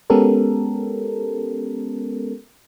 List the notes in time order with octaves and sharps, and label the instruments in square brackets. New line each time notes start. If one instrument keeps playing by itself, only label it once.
[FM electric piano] G#3 B3 C#4 G4 A4 A#4